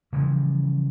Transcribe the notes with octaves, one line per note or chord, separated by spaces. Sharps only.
C#3 E3 F3 G3